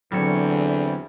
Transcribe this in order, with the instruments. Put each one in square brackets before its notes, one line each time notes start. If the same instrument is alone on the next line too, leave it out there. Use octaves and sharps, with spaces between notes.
[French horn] E2 [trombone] D3 [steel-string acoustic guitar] F#3 [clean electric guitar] G3 C4 C#5